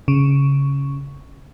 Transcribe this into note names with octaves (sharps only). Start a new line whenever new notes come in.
C#3